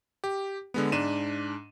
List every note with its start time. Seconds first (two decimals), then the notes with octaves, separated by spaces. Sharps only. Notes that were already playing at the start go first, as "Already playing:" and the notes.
0.24 G4
0.74 D3 G#3 B3
0.92 G#2 D4 D#7 E7